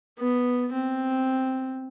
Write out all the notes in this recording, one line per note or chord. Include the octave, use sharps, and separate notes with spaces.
B3
C4